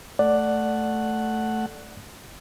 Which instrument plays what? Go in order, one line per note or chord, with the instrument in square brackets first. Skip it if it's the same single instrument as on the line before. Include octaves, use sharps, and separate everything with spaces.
[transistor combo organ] A3 F#5 [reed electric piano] D5